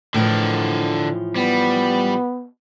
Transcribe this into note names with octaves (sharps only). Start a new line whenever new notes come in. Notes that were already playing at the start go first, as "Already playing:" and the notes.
A2 D3 E3 F3 A#4
G3 B3